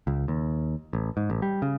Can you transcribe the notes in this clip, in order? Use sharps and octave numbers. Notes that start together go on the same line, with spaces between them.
C#2
D#2
A1
G#2
A1
G3
C#3